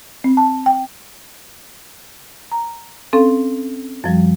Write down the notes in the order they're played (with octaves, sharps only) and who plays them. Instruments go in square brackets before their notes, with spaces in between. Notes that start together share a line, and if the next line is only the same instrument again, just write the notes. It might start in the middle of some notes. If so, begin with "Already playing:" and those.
[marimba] C4
A5
G5
A#5
C4 C#4 A4 F5
F#2 F3 G3